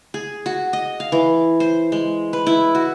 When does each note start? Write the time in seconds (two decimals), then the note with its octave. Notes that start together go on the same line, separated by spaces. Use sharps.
0.14 G#4
0.46 F#4
0.73 D#5
1.00 F5
1.12 E3
1.60 C5
1.92 G#3
2.33 B4
2.47 E4
2.75 F#4